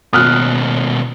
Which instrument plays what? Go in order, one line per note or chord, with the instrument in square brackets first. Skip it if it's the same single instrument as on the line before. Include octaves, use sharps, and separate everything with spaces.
[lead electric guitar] D#2 B2 [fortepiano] D#6 F6 F#6